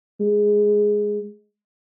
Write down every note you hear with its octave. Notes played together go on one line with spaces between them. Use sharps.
G#3